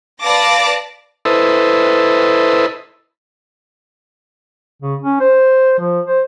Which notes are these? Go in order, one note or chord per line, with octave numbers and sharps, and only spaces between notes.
B4 D5 F5 A5 D6 A#6
E4 A4 B4 C5 D#5
C#3
C#4
C5
F3
C5